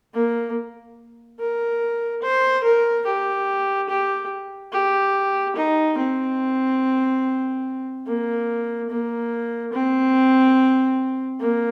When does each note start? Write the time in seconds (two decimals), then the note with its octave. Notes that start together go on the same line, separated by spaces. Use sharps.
0.14 A#3
1.39 A#4
2.22 C5
2.64 A#4
3.06 G4
3.89 G4
4.72 G4
5.56 D#4
5.98 C4
8.06 A#3
8.90 A#3
9.73 C4
11.40 A#3